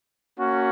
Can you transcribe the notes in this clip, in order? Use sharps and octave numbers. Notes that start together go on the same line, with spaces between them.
A#3 C#4 F#4